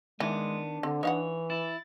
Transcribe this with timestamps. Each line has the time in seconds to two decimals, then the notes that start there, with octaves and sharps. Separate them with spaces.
0.20 D#3 E3 G#3 B3 D4
0.83 D3 C4
1.03 E3 D#4 C#5 F5 F#5
1.50 E4 A6